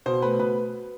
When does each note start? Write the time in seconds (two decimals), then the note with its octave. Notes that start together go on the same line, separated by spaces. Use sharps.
0.06 B2 C5
0.22 A3 B4
0.39 B2 B4